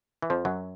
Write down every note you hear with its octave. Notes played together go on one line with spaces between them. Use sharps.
E3
F2 F3
F#2 F#3